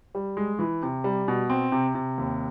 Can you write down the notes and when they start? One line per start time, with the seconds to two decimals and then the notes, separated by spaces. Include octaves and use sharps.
0.15 G3
0.37 G#3
0.59 E3
0.83 C3
1.04 G3
1.28 B2
1.50 C4
1.72 C3
1.95 C3
2.18 D#2